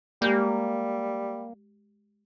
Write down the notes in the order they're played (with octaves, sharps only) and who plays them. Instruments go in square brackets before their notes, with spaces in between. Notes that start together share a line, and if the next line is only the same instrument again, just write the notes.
[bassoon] G3 [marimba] G#3 G4 G6 [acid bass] A#3